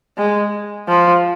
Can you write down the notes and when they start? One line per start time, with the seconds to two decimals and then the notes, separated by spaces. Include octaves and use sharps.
0.18 G#3
0.88 F3